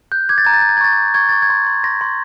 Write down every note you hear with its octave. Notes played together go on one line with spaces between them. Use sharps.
F#6 G6
D6 G#6
A6
A#5 G#6
A6
A#5 G#6
A6
G#6
C#6 A6
G6 G#6
C#6 G#6
C#6 A6
G#6
C6
C6
C6 A#6
C6